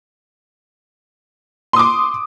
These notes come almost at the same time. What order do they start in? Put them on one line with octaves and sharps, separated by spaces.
C6 D#6 D6